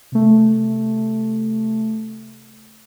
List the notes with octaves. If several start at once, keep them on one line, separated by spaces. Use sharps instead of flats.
C3 A3